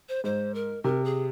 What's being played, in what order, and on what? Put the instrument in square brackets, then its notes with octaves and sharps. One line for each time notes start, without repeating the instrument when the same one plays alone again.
[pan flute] C5
[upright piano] G#2 [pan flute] C5
[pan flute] A#4
[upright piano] C3 [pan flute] A#4
[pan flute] G#4